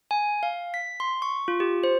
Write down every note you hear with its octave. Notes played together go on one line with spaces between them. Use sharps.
G#5
F5
B6
C6
C#6
F4
G4
C5